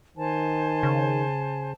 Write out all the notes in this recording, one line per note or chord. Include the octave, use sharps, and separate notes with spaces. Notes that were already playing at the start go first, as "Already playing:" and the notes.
D#3 C5 G#5 A5
C#3